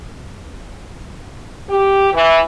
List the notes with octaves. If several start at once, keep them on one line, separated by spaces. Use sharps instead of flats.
G4
E3